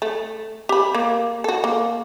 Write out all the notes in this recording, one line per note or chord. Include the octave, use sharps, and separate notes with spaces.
A3
G4 B5
A#3
F#4 A4
A#3